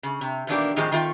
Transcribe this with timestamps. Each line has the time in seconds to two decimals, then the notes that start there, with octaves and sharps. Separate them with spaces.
0.03 C#3
0.21 C3
0.47 B2 D#3 E3 A#3 D4 G4
0.76 A2 D#3 F3 G#3 C4 G4
0.92 D#3 A3 C4 F4 G5